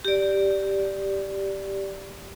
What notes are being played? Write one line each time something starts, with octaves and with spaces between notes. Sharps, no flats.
G4 D5